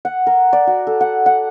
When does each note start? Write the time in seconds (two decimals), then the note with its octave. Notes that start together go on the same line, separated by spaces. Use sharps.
0.05 F#5
0.27 A#4
0.53 D5
0.67 F#4
0.87 A4
1.01 F#5
1.26 F#5